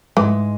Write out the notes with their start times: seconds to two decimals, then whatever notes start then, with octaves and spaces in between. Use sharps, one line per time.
0.17 G#2 E3 G#3